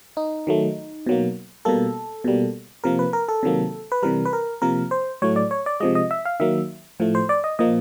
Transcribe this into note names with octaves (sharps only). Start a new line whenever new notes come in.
D#4
D#3 F#3 A3
B2 F#3 A#3
B2 G3 A#3 A4
B2 G3 A#3
C3 F3 A#3 A#4
B4
A#4
A4
C3 D#3 F#3 A#3
B4
C3 E3 G3 A#4
B4
A#4
C3 F3 A#3 A#4
C5
A2 F#3 A3 C#5
D5
C#5
D5
C3 F3 G#3 D#5
D#5
E5
F5
D#3 F#3 A#3 E5
A2 F3 A3
C5
D5
D#5
A#2 F3 A#3 D#5